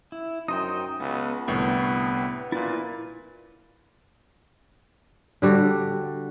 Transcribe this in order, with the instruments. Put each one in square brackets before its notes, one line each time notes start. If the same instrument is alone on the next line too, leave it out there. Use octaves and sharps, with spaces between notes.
[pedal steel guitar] E4
[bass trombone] F#2 [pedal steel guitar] D#4 C5 G5 [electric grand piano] D#6
[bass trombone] C#2 [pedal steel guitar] B3
[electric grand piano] C2 A2 D3 [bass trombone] B3 [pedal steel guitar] G5 C#6
[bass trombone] A#2 [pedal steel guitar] E4 B4 [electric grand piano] A6
[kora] D3 G3 F#4